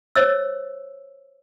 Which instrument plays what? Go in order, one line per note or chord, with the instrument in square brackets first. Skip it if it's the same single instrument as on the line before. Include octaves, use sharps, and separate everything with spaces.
[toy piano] C5 C#5 D#5 E6